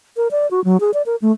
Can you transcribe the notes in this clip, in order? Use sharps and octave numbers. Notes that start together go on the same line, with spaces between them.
A#4
D5
F#4
F#3
G#4
D5
A#4
A3